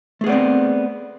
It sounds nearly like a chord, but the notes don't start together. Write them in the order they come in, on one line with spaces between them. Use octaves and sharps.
A3 G#4 B3 D5 C4